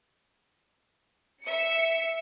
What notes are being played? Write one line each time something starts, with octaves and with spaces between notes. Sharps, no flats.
E5 C#7